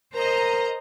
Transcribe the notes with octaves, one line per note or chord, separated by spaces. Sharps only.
A#4 C5 D#5 A#5